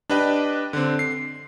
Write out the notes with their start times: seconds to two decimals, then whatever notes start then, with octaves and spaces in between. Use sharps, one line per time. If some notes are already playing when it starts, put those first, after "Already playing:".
0.10 D4 G4 B4 D#5 G5
0.73 D3 C4
0.99 C7